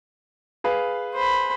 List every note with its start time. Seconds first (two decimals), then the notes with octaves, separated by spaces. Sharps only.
0.64 G#4 B4 F5
1.14 C5 B5